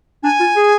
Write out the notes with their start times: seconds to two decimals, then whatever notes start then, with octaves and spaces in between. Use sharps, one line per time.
0.23 D4 G#5
0.40 F4
0.56 G#4